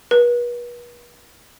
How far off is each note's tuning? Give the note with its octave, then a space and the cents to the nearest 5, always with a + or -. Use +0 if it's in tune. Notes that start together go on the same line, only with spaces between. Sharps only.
B4 -40